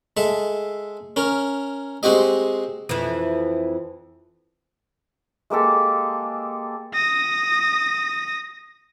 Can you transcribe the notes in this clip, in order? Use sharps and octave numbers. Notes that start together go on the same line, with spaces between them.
G#3 A4 E5
C#4 A#4
G#3 C4 F#4 G4 D#5
F2 E3
G#3 A#3 G4 A4
D#6 A#6